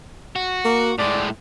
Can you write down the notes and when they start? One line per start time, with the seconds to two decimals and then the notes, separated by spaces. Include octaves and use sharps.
0.36 F#4
0.65 A#3
0.99 A2 G#3 D5